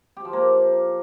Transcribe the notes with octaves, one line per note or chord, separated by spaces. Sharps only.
G4
F3
A#3